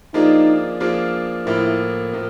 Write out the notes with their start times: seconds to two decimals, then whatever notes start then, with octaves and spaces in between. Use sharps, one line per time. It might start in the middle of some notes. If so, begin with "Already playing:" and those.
0.14 F3 A#3 D4 D#4 F4 G#4
0.80 F3 A#3 D4 F4 G#4
1.46 A2 F3 A#3 E4
2.13 A2 F3 A#3